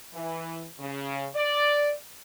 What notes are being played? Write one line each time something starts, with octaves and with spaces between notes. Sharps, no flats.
E3
C#3
D5